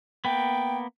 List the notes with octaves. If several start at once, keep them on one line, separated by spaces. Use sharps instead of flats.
A#3 B3 G5